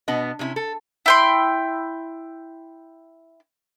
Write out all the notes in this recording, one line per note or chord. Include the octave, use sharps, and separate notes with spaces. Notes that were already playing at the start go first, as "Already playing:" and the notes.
B2 B3 D4 D#5
C3 C#4 D#4 E4
A4
E4 G5 C6